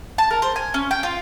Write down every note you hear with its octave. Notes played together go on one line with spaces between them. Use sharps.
A5
A#4
C5
G#5
C#4
G5
F4